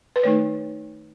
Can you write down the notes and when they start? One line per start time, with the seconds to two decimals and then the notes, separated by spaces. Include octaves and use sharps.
0.16 B4
0.23 D#3 A3 D#4 C#5